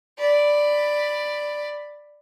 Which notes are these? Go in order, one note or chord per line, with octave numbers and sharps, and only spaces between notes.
D5 B5